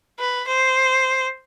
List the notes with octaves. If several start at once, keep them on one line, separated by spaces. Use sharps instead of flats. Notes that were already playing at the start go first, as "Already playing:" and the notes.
B4
C5